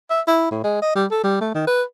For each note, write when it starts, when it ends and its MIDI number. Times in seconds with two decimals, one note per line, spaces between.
0.10 0.21 76
0.28 0.49 64
0.51 0.60 45
0.64 0.77 56
0.82 0.95 75
0.96 1.06 55
1.11 1.19 69
1.24 1.37 55
1.41 1.54 57
1.55 1.65 51
1.67 1.83 71